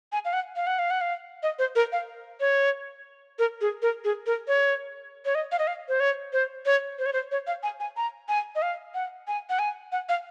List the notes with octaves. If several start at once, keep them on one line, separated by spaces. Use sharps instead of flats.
G#5
F5
F#5
F5
F#5
F5
F#5
F5
D#5
C5
A#4
F5
C#5
A#4
G#4
A#4
G#4
A#4
C#5
C#5
D#5
F5
D#5
F5
C5
C#5
C5
C#5
C5
C#5
C5
C#5
F5
G#5
G#5
A#5
G#5
D#5
F5
F#5
G#5
F#5
G#5
F#5
F5